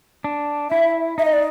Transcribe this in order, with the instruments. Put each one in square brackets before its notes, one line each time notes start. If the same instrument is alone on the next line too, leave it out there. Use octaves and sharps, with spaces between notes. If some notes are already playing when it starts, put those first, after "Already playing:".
[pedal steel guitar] D4
[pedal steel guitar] E4 [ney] E5
[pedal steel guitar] D#4 [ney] E5
[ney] D#5
D5